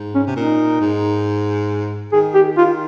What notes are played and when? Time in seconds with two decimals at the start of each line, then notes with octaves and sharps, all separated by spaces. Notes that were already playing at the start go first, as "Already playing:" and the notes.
Already playing: G#2
0.15 C#4
0.27 C3
0.37 A#2 D#4
0.81 G#2
2.13 D#3 G#4
2.35 G4
2.57 D#3 F4